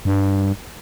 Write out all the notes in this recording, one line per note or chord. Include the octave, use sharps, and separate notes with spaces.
G2